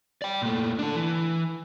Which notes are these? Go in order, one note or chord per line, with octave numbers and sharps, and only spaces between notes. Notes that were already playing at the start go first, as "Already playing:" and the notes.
D5 G5
A#2 A3
D4 A4
E3